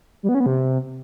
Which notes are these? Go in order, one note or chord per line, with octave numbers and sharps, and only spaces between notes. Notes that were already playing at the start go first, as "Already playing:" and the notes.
G3
B3
C#4
B3
C3